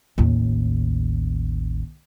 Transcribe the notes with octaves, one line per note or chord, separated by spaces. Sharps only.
A1 D#2